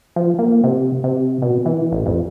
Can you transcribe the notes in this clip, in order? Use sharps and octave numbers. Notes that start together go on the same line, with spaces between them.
F3
A#3
C3
C3
B2
E3
A1
F2